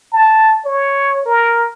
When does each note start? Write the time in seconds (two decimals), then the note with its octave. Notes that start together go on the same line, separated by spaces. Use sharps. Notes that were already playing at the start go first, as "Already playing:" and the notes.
0.12 A5
0.65 C#5
1.26 A#4